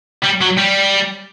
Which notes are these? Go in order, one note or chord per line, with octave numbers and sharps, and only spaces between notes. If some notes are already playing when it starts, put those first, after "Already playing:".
G3
F#3
G3